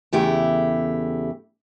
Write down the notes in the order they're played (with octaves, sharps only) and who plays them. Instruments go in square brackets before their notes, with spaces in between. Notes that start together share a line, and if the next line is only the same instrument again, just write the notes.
[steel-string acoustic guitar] E2 C#3 A3 E4 G4 G5